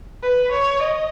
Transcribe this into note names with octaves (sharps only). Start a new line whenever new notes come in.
B4
C#5
D#5